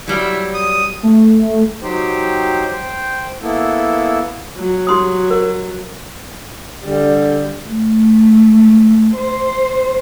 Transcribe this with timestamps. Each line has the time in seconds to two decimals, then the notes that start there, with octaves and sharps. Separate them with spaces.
0.08 F#3 G3 E4
0.54 D#6
1.03 A3
1.83 F#3 D#4 G4 C5 G5
2.72 C5 G5
3.43 A#3 B3 E4 A4
4.57 F#3
4.87 G4 C6 D#6
5.31 A#4
6.84 D3 G3
7.68 A3
9.16 C5